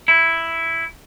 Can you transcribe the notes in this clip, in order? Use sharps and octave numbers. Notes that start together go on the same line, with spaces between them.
E4